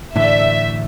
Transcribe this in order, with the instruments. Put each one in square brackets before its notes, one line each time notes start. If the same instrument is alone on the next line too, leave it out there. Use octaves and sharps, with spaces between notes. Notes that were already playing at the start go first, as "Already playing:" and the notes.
[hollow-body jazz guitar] A2 D3 E3 [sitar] A3 D5 [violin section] E5